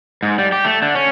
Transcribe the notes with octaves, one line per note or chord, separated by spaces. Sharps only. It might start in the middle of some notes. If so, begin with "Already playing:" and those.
G#2
G3
G4
A3
D3
C#4